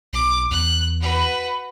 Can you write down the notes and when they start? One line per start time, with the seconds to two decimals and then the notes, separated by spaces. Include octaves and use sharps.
0.13 B1 D6
0.51 E2 F#6
1.01 F#4 B4